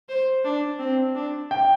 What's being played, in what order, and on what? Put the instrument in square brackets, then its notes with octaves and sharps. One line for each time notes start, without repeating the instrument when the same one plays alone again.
[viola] C5
D4
C4
D4
[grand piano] G5